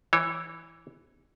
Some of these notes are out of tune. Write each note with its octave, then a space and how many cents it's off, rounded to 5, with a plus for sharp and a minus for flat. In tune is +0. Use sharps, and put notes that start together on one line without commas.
E3 +0 C#5 -30